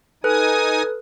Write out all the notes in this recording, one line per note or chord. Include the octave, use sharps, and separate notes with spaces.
D#4 A4 B4 G#5 D#6 F#6